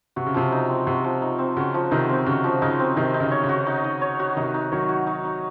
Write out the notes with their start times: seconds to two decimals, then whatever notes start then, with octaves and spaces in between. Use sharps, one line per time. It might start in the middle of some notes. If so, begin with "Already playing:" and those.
0.16 C3 F#4
0.26 C#3
0.34 C3 F3
0.52 D#4
0.69 C4
0.86 C3 F#4
1.04 F3
1.22 D#4
1.39 C4
1.57 C#3 F#4
1.74 F3
1.91 C3 D#3 D#4
2.09 C4
2.26 C#3 F#4
2.44 F3
2.62 C#3 D#4
2.80 C4
2.97 C3 D#3 D#4
3.14 D#4
3.20 C#3
3.31 C#5
3.43 C#3
3.49 F#4
3.66 D#4
3.84 D#4
4.01 C#5
4.20 F#4
4.36 C3 D#3 D#4
4.54 D#4
4.72 D#3 F#3 C#5
4.89 F#4
5.07 D#4
5.25 D#4